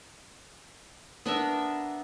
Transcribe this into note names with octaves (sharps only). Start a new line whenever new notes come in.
B3 D4 A#4 E5